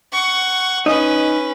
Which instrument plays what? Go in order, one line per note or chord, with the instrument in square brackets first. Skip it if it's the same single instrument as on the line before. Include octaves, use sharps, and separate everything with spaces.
[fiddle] F#5 C#6
[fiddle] C#4 B4 [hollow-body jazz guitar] D#4 D#5